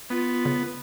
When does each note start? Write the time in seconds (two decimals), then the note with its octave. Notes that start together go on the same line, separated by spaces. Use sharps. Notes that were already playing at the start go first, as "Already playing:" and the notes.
0.10 B3 F4
0.45 C#3